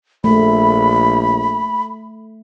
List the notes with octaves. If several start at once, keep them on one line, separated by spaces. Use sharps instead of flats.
A#1 A3 B5